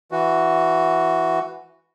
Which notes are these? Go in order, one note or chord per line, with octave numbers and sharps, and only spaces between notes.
E3 F#4